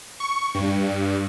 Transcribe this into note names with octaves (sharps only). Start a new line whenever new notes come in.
C#6
G2